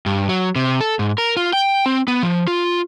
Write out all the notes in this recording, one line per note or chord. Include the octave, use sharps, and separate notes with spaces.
G2
F#3
C3
A4
G#2
A#4
F4
G5
C4
B3
F3
F4